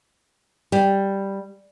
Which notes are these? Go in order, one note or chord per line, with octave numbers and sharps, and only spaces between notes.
G3